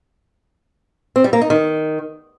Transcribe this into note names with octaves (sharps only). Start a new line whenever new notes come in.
C4
G3
A#3
D#4
D#3